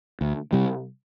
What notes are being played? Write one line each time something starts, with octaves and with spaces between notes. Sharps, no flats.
D2
C3 G3